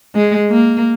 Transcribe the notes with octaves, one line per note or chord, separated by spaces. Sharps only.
G#3
A#3